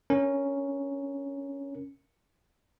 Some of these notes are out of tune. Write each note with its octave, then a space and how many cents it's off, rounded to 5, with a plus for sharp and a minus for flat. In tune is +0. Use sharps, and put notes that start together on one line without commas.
C#4 +5 A#4 +0